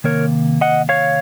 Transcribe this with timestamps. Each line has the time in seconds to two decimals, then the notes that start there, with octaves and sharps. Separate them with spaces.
0.04 C3 D#3 A#3 A#4 C#5
0.61 D#5 F#5
0.89 C#5 F5